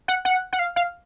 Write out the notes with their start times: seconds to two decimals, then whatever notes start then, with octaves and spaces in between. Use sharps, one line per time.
0.08 F#5
0.25 F#5
0.53 F#5
0.59 F5
0.76 F5